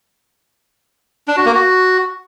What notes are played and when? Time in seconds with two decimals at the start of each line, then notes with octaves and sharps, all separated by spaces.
1.28 D4
1.37 F#4
1.46 A#3
1.54 F#4